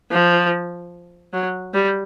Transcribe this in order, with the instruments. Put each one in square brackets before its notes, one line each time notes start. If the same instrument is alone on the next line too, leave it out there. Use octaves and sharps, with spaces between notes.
[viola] F3
F#3
G3